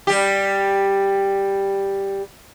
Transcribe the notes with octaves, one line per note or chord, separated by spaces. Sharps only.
G3 G4